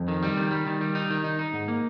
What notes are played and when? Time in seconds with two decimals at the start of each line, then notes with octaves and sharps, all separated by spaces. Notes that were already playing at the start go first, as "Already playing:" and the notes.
Already playing: F2
0.08 D#3
0.23 G3
0.37 D#3
0.51 G3
0.67 D#3
0.81 G3
0.95 D#4
1.10 D#3
1.24 D#4
1.39 D#4
1.53 G#2
1.68 A#3